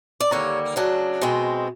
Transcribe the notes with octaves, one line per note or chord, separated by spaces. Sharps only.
D5
D#2 D3 G3 A#3 C#5
C#3 F#3 A3 D4
B2 G#3 C4